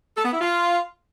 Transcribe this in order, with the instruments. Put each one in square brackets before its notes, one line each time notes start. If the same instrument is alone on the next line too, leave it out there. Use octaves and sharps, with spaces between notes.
[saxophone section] A4
B3
E4
F4